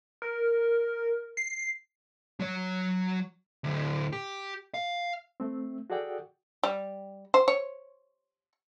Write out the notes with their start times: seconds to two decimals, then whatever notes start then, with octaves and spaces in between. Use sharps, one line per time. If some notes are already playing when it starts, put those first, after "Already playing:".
0.22 A#4
1.37 C7
2.40 F#3 C#5
3.64 D2 A2
4.13 G4
4.74 F5
5.40 A3 C4
5.90 F#4 G#4 A4 D5 F#5 G5
6.63 G3
7.34 C5
7.48 C#5